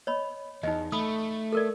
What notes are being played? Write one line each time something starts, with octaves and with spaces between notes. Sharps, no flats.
C#5 D#5 B5
E2 D#4 D#5
A3 B5 D#6
A4 A#4 D5